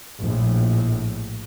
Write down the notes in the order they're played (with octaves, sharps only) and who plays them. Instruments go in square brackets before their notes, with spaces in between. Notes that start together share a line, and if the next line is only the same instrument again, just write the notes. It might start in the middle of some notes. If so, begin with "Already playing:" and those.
[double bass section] A#1 A2